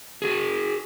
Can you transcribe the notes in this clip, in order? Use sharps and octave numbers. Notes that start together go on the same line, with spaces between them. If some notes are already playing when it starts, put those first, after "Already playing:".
F#4 G#4